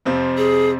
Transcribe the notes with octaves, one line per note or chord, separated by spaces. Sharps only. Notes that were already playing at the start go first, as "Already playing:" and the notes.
F2 C3 F3 C4
G#4